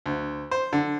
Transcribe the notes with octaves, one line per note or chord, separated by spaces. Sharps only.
D2
C5
D3